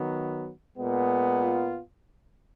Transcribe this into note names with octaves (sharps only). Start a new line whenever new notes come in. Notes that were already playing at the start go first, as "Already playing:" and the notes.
Already playing: D#3 F#3 B3
A#2 G#3 B3
F4